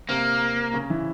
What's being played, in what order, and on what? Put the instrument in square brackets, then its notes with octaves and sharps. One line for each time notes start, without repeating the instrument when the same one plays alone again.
[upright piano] C3 C4 [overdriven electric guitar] A#3
[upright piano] C#3 C#4
E3 E4